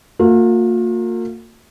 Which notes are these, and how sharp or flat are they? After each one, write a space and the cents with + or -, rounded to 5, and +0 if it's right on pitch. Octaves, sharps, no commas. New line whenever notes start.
A#3 -35 F4 +45